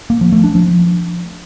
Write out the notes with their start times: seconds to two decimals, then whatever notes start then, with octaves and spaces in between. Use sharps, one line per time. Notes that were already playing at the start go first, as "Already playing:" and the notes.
0.10 A#3
0.21 F3
0.32 A3
0.44 D4
0.55 F3